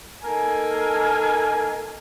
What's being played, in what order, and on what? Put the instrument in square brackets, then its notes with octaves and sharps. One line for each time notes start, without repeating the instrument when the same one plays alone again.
[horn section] A#3 D#4 A4 A#4 G#5